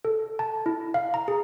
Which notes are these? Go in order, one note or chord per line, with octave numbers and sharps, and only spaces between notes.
A4
A5
E4
F5
A#5
G#4